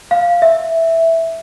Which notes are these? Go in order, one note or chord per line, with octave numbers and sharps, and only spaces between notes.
F5
E5